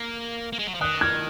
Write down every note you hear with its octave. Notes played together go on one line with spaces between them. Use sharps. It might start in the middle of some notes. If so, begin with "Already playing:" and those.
Already playing: A#3
A#3
G#3
F#3
F3
D#3 D#6 F#6
F6 G#6